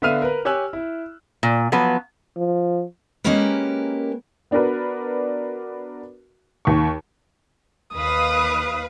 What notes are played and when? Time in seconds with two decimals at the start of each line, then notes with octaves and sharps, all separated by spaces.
0.02 D3 B3 E5 F5 F6 D#7
0.22 A#4 B4
0.45 G4 C#5 G#5 E6 F#6
0.73 E4
1.43 A#2
1.72 F3 F#3 B3 B4
2.37 F3
3.24 G#3 A#3 C#4 G4 A#4 B4
4.51 B3 D4 F#4 A#4 B4
6.65 D#2 C#6
7.95 D#2 B4 F5 D#6